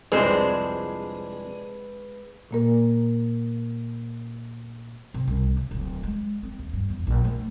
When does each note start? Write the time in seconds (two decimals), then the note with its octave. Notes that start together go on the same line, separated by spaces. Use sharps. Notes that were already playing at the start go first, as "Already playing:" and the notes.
0.12 C2 F2 C3 G#3 D4 G#4 B4 C5
2.51 A#2 A#3 A#4
5.14 C3
5.27 C2
5.57 C#3
5.71 D1
6.03 G#3
6.43 C4
6.59 D#2
6.73 G2
6.90 E2
7.07 A#1
7.25 A3